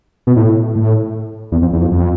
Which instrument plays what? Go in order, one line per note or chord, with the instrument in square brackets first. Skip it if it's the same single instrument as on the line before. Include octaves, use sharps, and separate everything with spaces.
[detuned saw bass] B2
A2
A2
E2
F2
E2
F2
F2